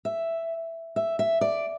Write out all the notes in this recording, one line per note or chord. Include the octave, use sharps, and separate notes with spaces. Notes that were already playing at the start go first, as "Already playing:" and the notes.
E5
E5
E5
D5